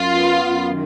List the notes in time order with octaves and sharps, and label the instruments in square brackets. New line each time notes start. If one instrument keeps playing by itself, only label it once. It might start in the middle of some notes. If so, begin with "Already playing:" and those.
Already playing: [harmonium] F#2 [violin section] F4
[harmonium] B3
F#2
D#3